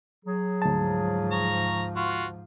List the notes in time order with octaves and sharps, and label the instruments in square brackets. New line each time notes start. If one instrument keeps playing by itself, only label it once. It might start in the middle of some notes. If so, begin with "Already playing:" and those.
[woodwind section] F#3 G#4
[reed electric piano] D2 A5 [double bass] G#2 F3
[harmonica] A#5 C#6
F4 F#4